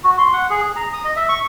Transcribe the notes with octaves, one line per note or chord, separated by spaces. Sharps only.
F#4
C6
F#5
G#4
G#4
A#5
D#6
D#5
E5
C#6